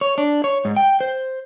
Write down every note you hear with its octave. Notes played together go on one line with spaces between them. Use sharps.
C#5
D4
C#5
G#2
G5
C5